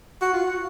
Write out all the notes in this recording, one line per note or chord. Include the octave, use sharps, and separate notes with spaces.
F#4
F4
F#4